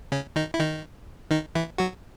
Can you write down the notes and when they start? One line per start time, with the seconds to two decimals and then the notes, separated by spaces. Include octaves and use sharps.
0.12 C#3 C#4
0.36 D#3 D#4
0.54 E4
0.60 D#3 D#4
1.31 D#3 D#4
1.55 E3 E4
1.78 F#3 F#4